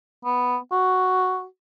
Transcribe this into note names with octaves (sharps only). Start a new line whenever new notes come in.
B3
F#4